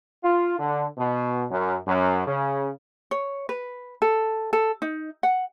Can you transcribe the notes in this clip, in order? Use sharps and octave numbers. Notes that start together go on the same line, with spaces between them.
F4
D3
B2
F#2
F#2
C#3
C#5
B4
A4
A4
D#4
F#5